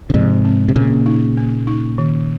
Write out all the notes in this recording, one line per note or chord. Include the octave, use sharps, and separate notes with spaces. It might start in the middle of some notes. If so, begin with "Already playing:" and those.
C#3
G#2 C3 F3
C4
C3
A#2 C#3 A#3
D#4
A#3
D#4
D#3